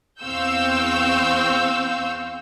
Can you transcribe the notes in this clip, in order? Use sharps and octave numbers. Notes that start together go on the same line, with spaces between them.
E2 C4 F5 C#6 E6 G6